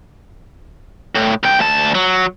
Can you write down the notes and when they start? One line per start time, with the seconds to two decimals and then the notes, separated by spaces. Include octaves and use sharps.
1.15 A2
1.43 C2 G5
1.59 D2 A5
1.95 F#3